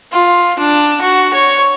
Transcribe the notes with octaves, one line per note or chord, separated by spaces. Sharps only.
F4
D4
F#4
C#5